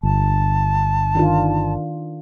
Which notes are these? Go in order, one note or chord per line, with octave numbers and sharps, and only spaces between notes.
G1 A5
D#3 D4 F4